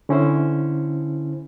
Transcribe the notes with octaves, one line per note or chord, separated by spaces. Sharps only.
D3 C#4 E4 C5